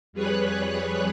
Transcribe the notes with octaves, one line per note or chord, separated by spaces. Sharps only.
F2 G3 G#4 B4 C#5 F#6